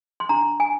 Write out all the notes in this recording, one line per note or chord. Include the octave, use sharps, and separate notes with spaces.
C6
D4 A#5
G#5